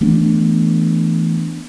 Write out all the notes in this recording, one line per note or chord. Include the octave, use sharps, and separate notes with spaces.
E3 A3 B3 D4